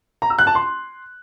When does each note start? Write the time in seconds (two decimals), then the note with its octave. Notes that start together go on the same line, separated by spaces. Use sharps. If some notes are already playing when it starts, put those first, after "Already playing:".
0.22 A#5
0.30 E6
0.39 F#6
0.47 A5
0.55 C6